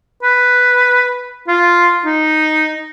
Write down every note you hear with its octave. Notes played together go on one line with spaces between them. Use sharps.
B4
F4
D#4